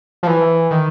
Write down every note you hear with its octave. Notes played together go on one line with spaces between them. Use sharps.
F3
E3
D#3